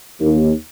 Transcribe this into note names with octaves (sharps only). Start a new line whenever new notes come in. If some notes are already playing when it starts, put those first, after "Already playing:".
D#2